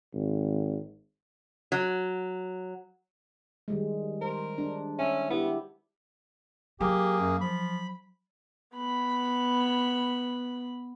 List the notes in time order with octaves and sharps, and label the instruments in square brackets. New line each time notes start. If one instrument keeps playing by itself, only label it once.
[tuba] G#1
[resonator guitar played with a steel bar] F#3
[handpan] D#3 G3 G#3
[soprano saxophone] A#4 [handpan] C5
[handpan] D4
[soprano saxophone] C#4 [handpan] E5
[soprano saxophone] B3 [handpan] E4 G4
[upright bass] F#3 [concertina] A#3 G#4 [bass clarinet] G4
[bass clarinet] F#2
[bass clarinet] F3 [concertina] B5
[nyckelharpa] B3 B5